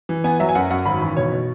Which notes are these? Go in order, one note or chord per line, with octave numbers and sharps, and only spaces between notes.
E3
B3 G#5
F#3 E5
G#5
F#2 F#5
F#2 F#5
G#1 B5
E3 B5
B2 C#5
B2